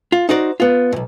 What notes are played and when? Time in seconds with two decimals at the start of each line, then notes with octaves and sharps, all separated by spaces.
0.12 F4
0.29 D#4 F#4 C5 D5
0.60 B3 F4
0.92 B1 G2